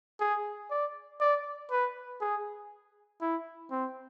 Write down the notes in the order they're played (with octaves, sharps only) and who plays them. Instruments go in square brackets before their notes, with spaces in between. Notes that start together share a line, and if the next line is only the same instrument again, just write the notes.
[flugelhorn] G#4
D5
D5
B4
G#4
E4
C4